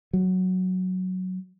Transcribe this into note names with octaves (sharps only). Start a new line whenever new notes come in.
F#3